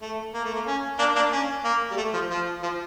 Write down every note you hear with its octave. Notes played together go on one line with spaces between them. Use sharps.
A3
A#3
A3
A#3
C#4
A#3 D4
A#3 D4
C#4
A#3
G3
A3
F3
F3
F3